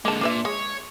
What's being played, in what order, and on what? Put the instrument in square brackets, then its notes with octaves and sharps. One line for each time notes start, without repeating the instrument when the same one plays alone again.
[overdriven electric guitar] D3 G#3 [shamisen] A#3 A5
[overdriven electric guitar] A#2 [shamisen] D4 B4 E5
[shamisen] G#3 [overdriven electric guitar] C#5